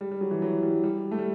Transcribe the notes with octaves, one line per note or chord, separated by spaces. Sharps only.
G3
G3
F#3
E3
F#3
G3
G3
A3
G3